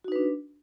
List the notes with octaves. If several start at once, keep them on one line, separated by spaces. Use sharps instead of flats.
D4 D#4 F#4 B4